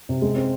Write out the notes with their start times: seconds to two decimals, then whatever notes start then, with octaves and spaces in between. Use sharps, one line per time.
0.09 C3
0.22 G#3
0.36 C4